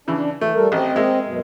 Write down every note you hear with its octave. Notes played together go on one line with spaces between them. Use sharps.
C#3 E3 D4
E3 A3
G3 A4 A#4
A1 C4 D#5
G#3 A#3 E5
F#2 B2